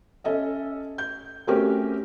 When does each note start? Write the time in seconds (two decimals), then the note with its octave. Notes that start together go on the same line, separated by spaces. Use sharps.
0.24 C#4 A4 D#5 E5
0.98 G6
1.47 A3 C4 C#4 F#4 G4 A#4